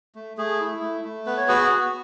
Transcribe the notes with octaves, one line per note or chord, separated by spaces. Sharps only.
A3
A3 G#4
E4
A3
A3
B3 B4
C#5
F#4 G#4 B4
B3